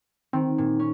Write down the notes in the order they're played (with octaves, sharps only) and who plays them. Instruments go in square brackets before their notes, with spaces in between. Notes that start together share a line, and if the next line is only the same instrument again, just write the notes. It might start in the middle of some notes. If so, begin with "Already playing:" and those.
[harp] D#3 [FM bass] C4
[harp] A#2
C#4